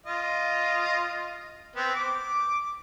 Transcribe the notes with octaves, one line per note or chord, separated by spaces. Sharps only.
F4 D#5
B3 C4
D6